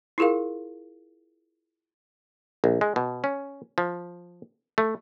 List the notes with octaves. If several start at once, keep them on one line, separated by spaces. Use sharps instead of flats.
E4 F4 G#4 A#4 F5
A#1
G#3
B2
C#4
F3
A3